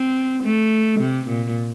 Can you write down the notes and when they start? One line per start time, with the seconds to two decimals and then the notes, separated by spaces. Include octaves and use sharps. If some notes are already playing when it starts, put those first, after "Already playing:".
Already playing: C4
0.43 A3
1.00 C3
1.28 A#2